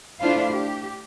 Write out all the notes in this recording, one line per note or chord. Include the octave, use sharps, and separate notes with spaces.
A3 D4 E4 F4 C5 F5
G4